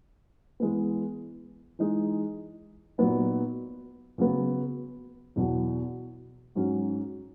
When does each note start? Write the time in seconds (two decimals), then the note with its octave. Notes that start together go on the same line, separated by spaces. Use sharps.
0.60 E3 G#3 B3
1.79 E3 G#3 D#4
2.98 A#2 F#3 B3 D#4
4.18 C#3 F#3 B3
5.36 E2 B2 F#3
6.55 G#2 F#3 C#4 F#4